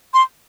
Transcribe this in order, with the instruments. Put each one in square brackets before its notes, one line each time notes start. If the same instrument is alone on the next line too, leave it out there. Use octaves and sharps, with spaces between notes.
[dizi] C6